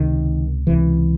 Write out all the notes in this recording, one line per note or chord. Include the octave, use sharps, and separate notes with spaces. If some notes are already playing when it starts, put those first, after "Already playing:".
Already playing: C#2 C3 D#3
C#2 C3 E3